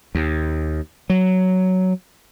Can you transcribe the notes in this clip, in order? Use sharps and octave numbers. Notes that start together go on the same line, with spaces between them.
D#2
F#3